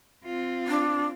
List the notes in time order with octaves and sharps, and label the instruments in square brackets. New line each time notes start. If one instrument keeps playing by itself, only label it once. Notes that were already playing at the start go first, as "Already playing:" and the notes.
[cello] C4 F4
[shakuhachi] D4